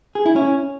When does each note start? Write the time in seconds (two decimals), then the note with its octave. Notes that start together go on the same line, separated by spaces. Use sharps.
0.15 G#4
0.26 E4
0.36 C#4